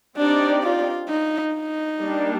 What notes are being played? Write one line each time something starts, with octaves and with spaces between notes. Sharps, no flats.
C4 D4 D#4 G4 D5
F4
D#4
D#4
G3 A#3 D4